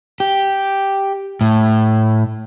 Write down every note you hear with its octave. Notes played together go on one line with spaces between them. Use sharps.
G4
A2